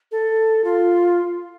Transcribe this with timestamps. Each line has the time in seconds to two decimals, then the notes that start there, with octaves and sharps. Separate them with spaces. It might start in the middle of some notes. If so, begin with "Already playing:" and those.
0.12 A4
0.64 F4